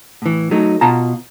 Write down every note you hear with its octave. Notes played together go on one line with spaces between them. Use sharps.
A2 E3
F#3 A3 D#4
B2 F4 A5 A#5